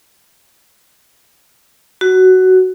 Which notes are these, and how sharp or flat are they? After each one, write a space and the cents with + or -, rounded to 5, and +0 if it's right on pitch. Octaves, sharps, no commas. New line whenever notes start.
F#4 +10